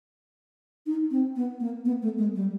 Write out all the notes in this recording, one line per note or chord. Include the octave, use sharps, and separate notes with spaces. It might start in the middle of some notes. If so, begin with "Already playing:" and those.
D#4
C4
B3
A#3
B3
A3
G#3
G3